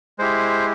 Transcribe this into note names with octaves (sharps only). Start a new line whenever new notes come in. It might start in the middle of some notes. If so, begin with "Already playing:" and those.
G#3 E4 G4 C5